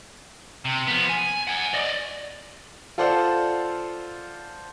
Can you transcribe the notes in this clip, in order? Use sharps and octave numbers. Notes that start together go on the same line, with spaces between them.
C3
F3 B3
G#5
F#5 G#5
D5 D#5
F4 A4 C5 D5 F#5